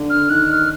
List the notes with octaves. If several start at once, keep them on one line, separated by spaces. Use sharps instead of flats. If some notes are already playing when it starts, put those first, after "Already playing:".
Already playing: D3
F6
D#3 F#6
F6